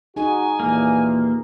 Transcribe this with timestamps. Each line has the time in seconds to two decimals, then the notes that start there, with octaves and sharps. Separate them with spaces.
0.16 D#4 F#4 G#4 G#5
0.60 D#2 A#2 E3 A#3